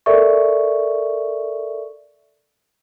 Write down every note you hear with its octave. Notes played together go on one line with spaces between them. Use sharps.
A4 A#4 D5 E5 C#6